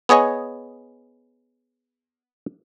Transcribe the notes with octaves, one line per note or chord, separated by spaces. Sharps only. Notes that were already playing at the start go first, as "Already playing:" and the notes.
B3 G#4 C#5 D#5 G#5